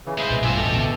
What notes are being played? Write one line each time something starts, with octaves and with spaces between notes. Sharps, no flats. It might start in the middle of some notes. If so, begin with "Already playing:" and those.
C#3 E3
G#3 G#4 B4 C5 E5
A#1 B2
D2 G2 F4 G4 E5 G#5
E1 A1 B2 A4
D3 B3